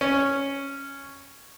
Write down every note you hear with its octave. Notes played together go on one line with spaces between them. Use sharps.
C#4